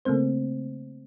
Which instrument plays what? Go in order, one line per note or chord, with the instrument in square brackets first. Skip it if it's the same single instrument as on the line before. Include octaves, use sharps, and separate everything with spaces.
[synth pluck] C#3 A3 A#3 C4 C5